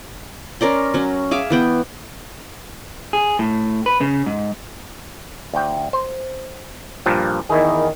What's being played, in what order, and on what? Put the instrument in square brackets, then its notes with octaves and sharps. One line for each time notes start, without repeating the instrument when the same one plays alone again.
[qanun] C#4 A#4 D5 C6
F#3 C#4
G#4 E5 F5 D6
E3 B3 G5
[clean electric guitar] G#4
A2
B4
C#3
G#2
[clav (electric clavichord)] D2 G5
C5
G2 A#2 F3
[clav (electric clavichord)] E2 E4 G#4 [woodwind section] D#3